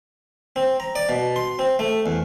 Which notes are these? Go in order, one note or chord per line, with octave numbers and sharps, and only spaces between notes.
C4
A#5
D5
B2
C6
C4
A3
E2